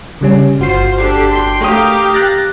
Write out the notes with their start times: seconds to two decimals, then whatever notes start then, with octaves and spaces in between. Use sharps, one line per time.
0.21 C#3 G3 C#4
0.59 G1 F4 F#4 C5 C7
0.97 D4 G4 A4
1.32 G5 C6
1.61 A3 G4 A#4 F5 D#6
2.14 F#6 A6 A#6